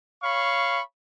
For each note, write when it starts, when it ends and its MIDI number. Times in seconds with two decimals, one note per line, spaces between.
0.23 0.81 73
0.23 0.81 77
0.23 0.81 83
0.23 0.81 85